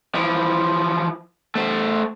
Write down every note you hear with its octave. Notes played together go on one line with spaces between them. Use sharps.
E3 F3
A3 C5